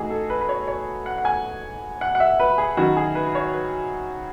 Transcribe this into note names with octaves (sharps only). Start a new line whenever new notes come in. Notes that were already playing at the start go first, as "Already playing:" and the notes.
Already playing: E3 A3 D#4 F#4 G#4
A4
B4
B4
C#5
C#5
F#5
F#5
G#5
F#5
F#5
E5
B4
G#4
D#3 F#3 C#4 E4 F#4
G#4
B4
C#5
B4